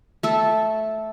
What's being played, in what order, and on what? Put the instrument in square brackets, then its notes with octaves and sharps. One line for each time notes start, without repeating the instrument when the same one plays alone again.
[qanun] A3 A4